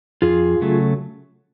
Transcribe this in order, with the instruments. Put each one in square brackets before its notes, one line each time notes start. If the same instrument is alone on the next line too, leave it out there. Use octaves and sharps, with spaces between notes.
[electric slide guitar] F2 F4 G#4
C#3 F#3 A3